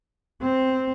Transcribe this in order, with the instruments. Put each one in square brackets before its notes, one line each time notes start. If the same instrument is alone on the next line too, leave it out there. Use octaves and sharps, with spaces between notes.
[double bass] C4